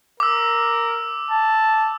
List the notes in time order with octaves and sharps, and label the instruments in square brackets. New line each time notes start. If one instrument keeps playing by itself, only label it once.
[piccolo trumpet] A#4 [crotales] D6 E6
[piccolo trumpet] A5